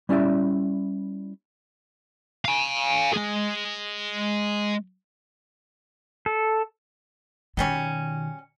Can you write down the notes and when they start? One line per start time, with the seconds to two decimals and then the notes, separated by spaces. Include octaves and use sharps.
0.09 G3 C#4 E4 D5 E5
2.45 F5 G#5
3.14 G#3 G#4
6.26 A4
7.57 B2 D#3 F#3 G3 C#4